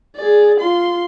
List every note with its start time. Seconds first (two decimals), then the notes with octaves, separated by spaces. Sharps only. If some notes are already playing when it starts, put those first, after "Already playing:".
0.16 G#4 D5
0.60 F4 C6